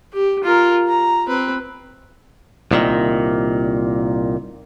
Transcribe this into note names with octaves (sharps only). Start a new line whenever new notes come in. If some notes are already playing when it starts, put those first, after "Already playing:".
G4
F4 A#4
A#5
C4 B4
C2 A#2 D#3